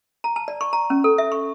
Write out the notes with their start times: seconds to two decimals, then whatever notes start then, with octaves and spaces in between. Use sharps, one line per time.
0.24 A#5
0.36 A5
0.48 D5
0.61 C#6
0.73 A#5
0.90 C#4
1.04 A4
1.18 E5
1.32 C#6